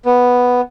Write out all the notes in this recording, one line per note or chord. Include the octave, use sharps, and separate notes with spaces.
B3